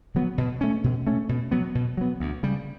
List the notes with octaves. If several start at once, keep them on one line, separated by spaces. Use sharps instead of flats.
D3 F#3 B3
B2
A3 C#4
B2
A3 C#4
B2
F#3 B3
B2
F#3 B3
D2
C#3 G3